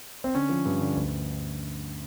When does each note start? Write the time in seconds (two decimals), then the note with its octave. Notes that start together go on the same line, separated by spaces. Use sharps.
0.24 C4
0.35 D3 C#4
0.49 F3
0.66 G2
0.80 D3
0.95 D2